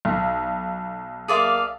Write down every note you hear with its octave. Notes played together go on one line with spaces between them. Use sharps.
B1
A#3 G#4 D5 E5 F5 D6